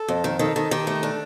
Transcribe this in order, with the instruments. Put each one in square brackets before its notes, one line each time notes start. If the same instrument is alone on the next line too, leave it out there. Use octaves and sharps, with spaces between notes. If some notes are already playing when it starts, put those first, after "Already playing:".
Already playing: [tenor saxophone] A4
[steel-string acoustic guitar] F2
D#3
[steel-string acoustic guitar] D#3 [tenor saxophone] A4
[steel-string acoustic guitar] D#3 [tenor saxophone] A4
[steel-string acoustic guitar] D#3 [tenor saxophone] G4
[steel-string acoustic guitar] A3 [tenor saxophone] G4
[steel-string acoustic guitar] D4 [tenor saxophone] A4